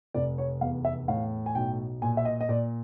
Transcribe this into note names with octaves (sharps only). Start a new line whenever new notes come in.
F1 D5
C#5
E2 F5
E5
A2 F5
G#5
B1 G5
A#2 G#5
E5
D#5
D#5
A#2 D5